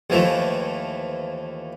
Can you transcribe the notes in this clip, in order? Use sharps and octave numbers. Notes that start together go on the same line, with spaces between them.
D#2 E3 F3 A3